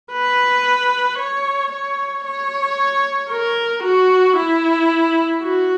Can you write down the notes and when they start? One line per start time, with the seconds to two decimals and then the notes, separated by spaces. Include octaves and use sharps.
0.12 B4
1.19 C#5
1.72 C#5
2.25 C#5
3.30 A#4
3.83 F#4
4.36 E4
5.42 F#4